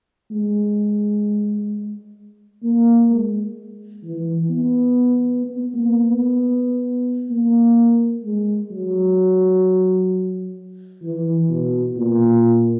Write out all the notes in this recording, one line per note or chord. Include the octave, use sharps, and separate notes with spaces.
G#3
A#3
G#3
E3
B3
B3
A#3
B3
A#3
G#3
F#3
E3
B2
A#2